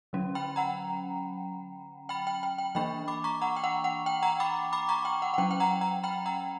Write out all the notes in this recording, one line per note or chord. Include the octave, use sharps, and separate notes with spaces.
D3 F#3 C#4
G5 B5
F#5 A#5
G5 B5
G5
G5
G5
E3 A#3 D4 G5 B5
B5 D6
A#5 C#6
F#5 A#5
G5
F#5
F#5
G5
F#5 A#5
B5 D6
B5 D6
A#5 C#6
G5
F#5
F#5
F#3 C#4 G5
G5
F#5 A#5
F#5 A#5
G5 B5
F#5 A#5